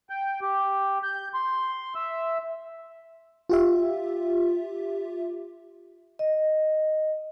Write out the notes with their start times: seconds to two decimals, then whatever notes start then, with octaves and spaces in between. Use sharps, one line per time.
0.10 G5
0.41 G4
1.03 G6
1.34 C6
1.95 E5
3.49 F4 G4 E5
6.19 D#5